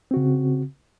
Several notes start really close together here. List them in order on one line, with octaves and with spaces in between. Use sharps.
C4 F#4 C#3